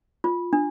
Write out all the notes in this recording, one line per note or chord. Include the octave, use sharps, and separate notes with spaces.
F4
D4